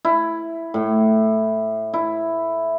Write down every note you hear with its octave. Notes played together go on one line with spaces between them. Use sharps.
E4
A2
E4